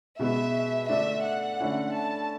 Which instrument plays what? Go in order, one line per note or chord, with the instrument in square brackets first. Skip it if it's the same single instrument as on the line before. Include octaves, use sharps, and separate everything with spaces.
[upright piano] B2 G#3 B3 E4 [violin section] E5
[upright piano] D3 A3 D4 [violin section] E5
[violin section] F#5
[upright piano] D3 A3 C#4 E4
[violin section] A5